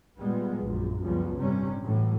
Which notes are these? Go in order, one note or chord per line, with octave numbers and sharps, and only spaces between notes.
A#2 G3 G#3 B3
A#1 F#2 A#2
C#2 F#2 F3 G3 B3 C#4
G1 A2 C3 G3 C#4
A2 E3 F#3